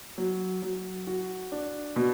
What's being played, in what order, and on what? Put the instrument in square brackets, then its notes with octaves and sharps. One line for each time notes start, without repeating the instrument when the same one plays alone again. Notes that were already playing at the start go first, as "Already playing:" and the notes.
[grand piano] F#3
F#3
F#4
D4
B2